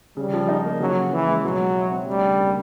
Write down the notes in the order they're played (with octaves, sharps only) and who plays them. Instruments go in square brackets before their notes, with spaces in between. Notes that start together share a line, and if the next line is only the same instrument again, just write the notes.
[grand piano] C#3 [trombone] G3
[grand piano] F3
D#4
A#3
[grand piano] C#3 [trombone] F#3
[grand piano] F3
[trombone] E3 [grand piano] C#4
[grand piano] G#3
[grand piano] B2 [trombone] F#3
[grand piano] G#3
E4
C4
[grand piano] D2 [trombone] G3
[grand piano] C#3
A#3